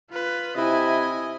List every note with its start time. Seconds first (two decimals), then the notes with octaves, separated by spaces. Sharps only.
0.11 F4 B4
0.57 C3 E4 D#5 G#5